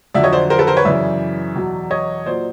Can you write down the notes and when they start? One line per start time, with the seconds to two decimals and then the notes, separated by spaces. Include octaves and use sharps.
0.14 F2 D3 F#3 D5 E5
0.23 C#5 D#5
0.33 C5 D5
0.50 A#4 C5
0.58 A4 B4
0.67 A#4 C5
0.77 B4 C#5
0.85 F#2 C#3 E3 D5 E5
1.56 E2 B2 F#3
1.91 C#5 D#5
2.26 A#2 F#3 C5 D5